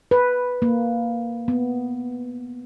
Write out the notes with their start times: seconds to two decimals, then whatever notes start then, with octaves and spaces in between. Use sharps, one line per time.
0.11 B4
0.62 A#3
1.48 B3